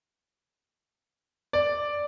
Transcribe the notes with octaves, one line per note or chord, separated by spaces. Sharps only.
D5